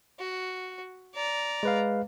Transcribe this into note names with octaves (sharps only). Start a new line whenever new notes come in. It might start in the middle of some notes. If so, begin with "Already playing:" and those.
F#4
D5 A#5
G#3 B4 F5